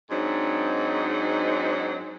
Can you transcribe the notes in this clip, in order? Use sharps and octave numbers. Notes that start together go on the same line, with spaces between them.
G#2 F#3 C4 D4 D#4